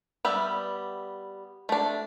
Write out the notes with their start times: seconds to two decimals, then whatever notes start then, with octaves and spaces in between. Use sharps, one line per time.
0.25 G3 B3 E5
1.69 A3 D4